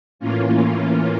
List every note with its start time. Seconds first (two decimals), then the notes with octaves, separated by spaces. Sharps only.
0.19 A2 E3 A#3 C#4 F4